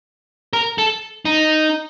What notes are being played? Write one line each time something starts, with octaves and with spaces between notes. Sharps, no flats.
A#4
A4
D#4